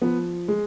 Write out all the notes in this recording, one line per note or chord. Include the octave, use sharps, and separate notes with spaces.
F3 B3
G#3